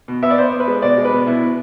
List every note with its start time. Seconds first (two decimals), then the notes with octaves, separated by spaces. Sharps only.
0.08 B2
0.23 B3 E5
0.31 D5
0.38 B3 C5
0.53 B3
0.60 B4
0.67 G#3
0.82 B2 D5
0.98 G#3
1.05 B4
1.12 B2
1.27 B2 E4
1.42 B2